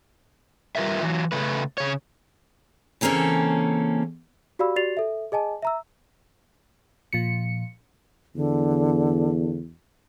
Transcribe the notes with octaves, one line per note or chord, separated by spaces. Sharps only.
G3 F4 A#4 B4 E5
E3 F#3
C#3 A3 B4
C#3 C#5
C#3 E3 A#3 C4 C#4 A4
F#4 G4 D5 F5 B5 E6
F#4 G4 D5 A6 C7 F7
A4 E5
G#4 D#5 G#5 A5
E5 A#5 E6
A#2 F3 C#7
E2 D3